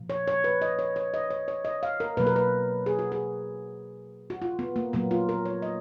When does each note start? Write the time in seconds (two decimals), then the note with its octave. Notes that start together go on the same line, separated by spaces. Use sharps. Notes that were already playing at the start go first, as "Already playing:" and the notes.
Already playing: A#2 F3 A#3
0.10 C#5
0.28 C#5
0.44 B4
0.62 D#5
0.79 C#5
0.96 C#5
1.14 D#5
1.30 C#5
1.48 C#5
1.65 D#5
1.83 F5
2.00 A#4
2.17 B2 F#3 A#3 B4
2.27 A#4
2.36 B4
2.86 G#4
2.99 F#4
3.12 G#4
4.30 F#4
4.42 F4
4.59 B3
4.76 A#3
4.93 A#2 F#3 A#3 B3
5.11 F4
5.29 A#4
5.45 C#5
5.62 D#5